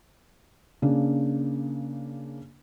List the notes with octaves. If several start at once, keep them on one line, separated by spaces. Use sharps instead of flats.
C#3 A#3 D4